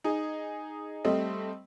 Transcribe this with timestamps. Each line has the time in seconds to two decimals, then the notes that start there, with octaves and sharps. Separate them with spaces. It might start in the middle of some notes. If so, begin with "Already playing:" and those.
0.04 D#4 G#4
1.04 G3 A3 C4 D#5